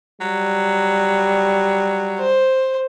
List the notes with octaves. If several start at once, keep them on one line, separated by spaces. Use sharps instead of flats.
F#3 G3
C5